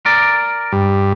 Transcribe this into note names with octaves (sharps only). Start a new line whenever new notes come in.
A#4 D5
G2